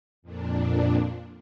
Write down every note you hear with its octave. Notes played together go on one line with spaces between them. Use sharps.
F2 A#2 D4